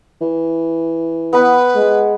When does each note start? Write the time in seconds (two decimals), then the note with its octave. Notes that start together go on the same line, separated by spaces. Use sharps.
0.21 E3
1.33 B3 B4 F#5 B5
1.75 G#3